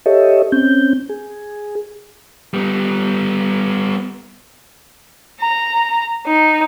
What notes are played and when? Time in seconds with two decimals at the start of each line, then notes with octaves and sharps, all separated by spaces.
0.06 G4 A4 C#5 D#5 E5
0.52 C4 C#4 G6
1.09 G#4
2.54 G3 B3
5.40 A#5
6.26 D#4